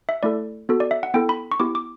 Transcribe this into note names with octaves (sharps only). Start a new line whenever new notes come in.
E5
A3 E4 A4 D5
B3 F#4 A4
D5
E5
F#5
B3 E4 A4 G5
B5
C#6
B3 E4 G4 D6
D6